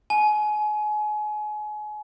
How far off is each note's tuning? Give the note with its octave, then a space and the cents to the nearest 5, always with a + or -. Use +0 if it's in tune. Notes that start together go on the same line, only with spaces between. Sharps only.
G#5 +30